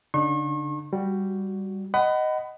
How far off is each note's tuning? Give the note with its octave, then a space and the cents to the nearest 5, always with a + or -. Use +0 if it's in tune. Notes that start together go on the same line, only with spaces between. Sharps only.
D3 -40 D4 +45 C#6 -40
G3 +0 F#4 +0
D#5 +0 F#5 +25 B5 +20